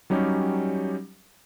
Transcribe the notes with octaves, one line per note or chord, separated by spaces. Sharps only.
F#3 G3 C#4 D#4 G4